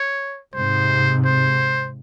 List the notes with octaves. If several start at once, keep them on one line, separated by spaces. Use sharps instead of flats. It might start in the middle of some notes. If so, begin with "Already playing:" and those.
Already playing: C#5
G#2 C3 C5
C5